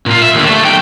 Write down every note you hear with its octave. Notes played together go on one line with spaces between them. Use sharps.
A#2 F4
E5
D#2 D3
A3
B1 G5